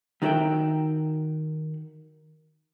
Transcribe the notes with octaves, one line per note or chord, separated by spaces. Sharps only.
D#3 D#4 F#4 C5 E5 G5